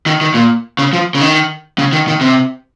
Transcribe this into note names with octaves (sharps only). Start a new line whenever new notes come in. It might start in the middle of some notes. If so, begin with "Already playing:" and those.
D#3
D#3
A#2
C#3
F3
C#3
D#3
C#3
D#3
D#3
C3